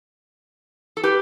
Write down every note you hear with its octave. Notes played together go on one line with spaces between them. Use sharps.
A4
G4 B4